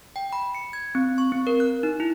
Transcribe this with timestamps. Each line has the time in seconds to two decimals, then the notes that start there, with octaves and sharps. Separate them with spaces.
0.16 G5
0.33 B5
0.55 C#7
0.73 G#6
0.95 C4
1.18 C#6
1.32 C4
1.47 A#4
1.60 F#6
1.83 D#4
2.00 E4